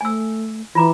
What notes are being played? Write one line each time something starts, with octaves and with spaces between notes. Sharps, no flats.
A3 G#5 E6
E3 F4 A#5 D6